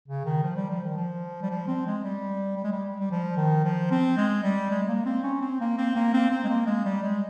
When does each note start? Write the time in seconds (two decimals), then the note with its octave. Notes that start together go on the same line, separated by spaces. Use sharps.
0.08 C#3
0.25 D#3
0.43 F3
0.56 G3
0.70 F3
0.84 D#3
0.97 F3
1.42 G3
1.50 F3
1.68 C4
1.87 G#3
2.04 G3
2.57 G3
2.64 G#3
2.72 G3
3.00 G3
3.11 F3
3.37 D#3
3.64 F3
3.91 C4
4.17 G#3
4.44 G3
4.71 G#3
4.84 G#3
4.88 A#3
5.06 C4
5.24 C#4
5.42 C4
5.60 A#3
5.78 C4
5.96 A#3
6.14 C4
6.31 C4
6.44 G#3
6.49 A#3
6.66 G#3
6.85 G3
7.03 G#3